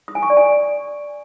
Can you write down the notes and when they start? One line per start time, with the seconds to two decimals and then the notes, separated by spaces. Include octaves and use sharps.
0.08 D#6
0.15 G#5
0.22 C#6
0.30 D5
0.37 G#5